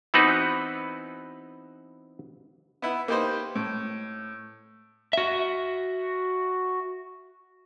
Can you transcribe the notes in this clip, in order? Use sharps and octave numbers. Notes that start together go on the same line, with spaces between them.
E3 B3 C4 D#4 F#4 B4
B3 E4
A#3 D#4 G4 B4 C5
A2
F#4 E5